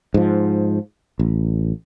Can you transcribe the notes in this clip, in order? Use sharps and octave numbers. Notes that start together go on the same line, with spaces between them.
G#2 F3
A1